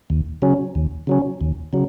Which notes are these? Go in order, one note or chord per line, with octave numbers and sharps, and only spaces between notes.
D#2
C#3 F#3 C#4
D#2
C#3 F#3 C#4
D#2
C#3 F#3